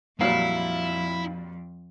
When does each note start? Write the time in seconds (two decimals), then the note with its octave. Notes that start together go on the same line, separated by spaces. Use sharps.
0.21 F2 A#2 F#3 G3 E4 F5